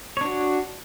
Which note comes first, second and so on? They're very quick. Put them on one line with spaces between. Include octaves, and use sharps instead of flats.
C#5 D4 F#4